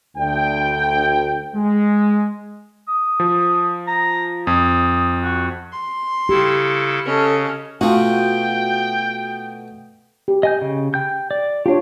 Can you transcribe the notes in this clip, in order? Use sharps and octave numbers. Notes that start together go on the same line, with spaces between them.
D2 G5
G#3
D#6
F3
A#5
F2 D#6
F#4
C6
C#3 E4 G4 A4
C#3 C#4 A4 D#5
B2 A3 F4 F#4 G5
G4
D#5 G#5 G6
C#3
G5 G6
D5
D4 F4 G4 C#5